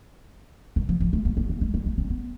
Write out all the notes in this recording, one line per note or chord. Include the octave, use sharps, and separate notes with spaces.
D#3
F3
F3
A3
A#3
A#3
A3
G#3
A#3
A3
C4
B3